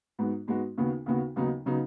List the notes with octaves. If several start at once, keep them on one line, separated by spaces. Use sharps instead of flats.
G#2 G#3 B3 F#4
G#2 G#3 B3 F#4
D#2 C#3 B3 F#4
D#2 C#3 B3 F#4
D#2 C#3 F#3 B3 D#4
C#3 F#3 B3 D#4